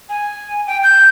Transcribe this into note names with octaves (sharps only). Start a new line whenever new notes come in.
G#5
G5
G6